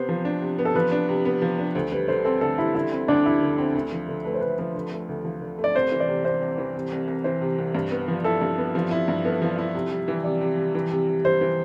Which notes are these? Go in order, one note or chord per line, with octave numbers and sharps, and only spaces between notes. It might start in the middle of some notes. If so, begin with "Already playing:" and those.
Already playing: C3 B3 C5
F3
D4
C3
B3
A4
F3 B4
D4
C3
B3
F3
D4
D2 C5
G3 B4
D3 C5
C4 A4
D2 A4
G3 E4
D3 E4
C4
D2 D4
G3 E4
D3
C4
D2
F3
D3
A3 B4
C5
D2 B4
F3 B4
D3
A3
D2
F3
D3
A3
D5
C2 C5
E3
D5
C3
C2 C5
C2
E3
C3
C2
C2
E3 C5
C3
C2
G2
B3
F3
E4 A4
G2
B3
F3
E4
G2
B3 A4
F3
E4
C3
G3
E3
C3 D5
C3
G3
E3
C3
C3
G3 C5
E3